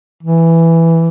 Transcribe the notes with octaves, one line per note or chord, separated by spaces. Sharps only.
E3